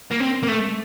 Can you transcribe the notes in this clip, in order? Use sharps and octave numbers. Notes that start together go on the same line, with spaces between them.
A#3
C4
A#3
A3